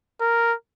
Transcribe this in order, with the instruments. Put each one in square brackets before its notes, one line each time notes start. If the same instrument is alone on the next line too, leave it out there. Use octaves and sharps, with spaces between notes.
[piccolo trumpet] A#4